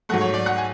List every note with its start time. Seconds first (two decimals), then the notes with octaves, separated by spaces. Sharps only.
0.09 G#2 F#3 A3 F#5
0.21 C#5
0.34 D5
0.46 F#5
0.58 G#5